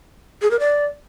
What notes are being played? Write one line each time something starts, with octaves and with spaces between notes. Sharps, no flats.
G#4
A#4
D5